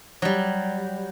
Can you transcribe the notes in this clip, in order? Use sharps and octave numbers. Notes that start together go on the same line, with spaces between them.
F#3 G3